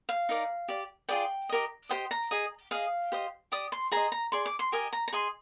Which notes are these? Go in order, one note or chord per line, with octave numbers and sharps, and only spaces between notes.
F5
D#4 A#4 D5
G4 D5
F4 G#4 D5 G5
G4 A#4 D#5
G4 C5 D#5 G5
A#5
G#4 D#5
G#4 D#5 F5
G4 C5 D#5
G4 D5 D#6
C6
G#4 C5 D#5 A#5
A#5
G#4 D5 C6
D6
C6
G4 A#4 D#5 G#5
A#5
A#5
G#4 D#5 C6